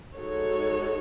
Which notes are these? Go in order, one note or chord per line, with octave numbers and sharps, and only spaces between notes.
G#3 D#4 F#4 A4 C#5